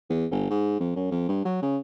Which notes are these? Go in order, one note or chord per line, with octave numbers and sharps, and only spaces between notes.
E2
G1
G#2
F2
F#2
F2
G2
F#3
C#3